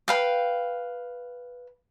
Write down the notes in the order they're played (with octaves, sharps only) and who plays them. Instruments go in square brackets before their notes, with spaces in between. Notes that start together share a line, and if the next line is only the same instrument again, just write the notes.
[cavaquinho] B4 F5 G5